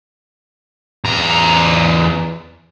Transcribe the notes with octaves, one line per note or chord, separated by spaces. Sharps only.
E2 A#5